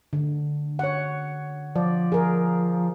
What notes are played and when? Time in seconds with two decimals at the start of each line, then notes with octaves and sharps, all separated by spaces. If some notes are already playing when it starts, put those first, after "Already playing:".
0.13 D3
0.79 C#5 F#5
1.76 F3 D5
2.12 G#4 A#4